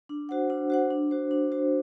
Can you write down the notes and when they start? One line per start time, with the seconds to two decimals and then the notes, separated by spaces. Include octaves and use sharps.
0.09 D4
0.29 F#4 C5 F#5
0.50 D4
0.70 F#4 C5 F#5
0.91 D4
1.11 F#4 C5
1.31 D4
1.52 F#4 C5